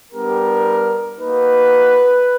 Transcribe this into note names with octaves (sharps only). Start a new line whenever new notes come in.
G3 B3 D4 G4 A#4
A#3 D#4 F#4 B4